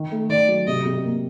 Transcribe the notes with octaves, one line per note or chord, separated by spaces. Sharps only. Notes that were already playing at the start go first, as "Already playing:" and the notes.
Already playing: D#3
A3
D#3 D5
F#3
C3 D#5
C3
A#3